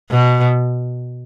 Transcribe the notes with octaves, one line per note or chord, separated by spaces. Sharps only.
B2